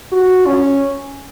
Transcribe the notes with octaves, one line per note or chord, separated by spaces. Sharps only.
F#4
C#4